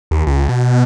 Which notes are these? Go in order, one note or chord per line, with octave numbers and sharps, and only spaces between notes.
D#2
C#2
B2